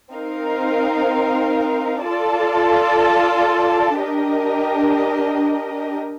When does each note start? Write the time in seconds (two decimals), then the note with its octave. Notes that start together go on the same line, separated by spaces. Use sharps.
0.13 C4 D#4 A#4 F5
2.06 F4 A4 D5 A5
4.01 D4 G4 A#4 D#5